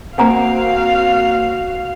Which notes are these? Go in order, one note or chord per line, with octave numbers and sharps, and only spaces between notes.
A#3 C4 F#4 F5 F#5 G#5 A#5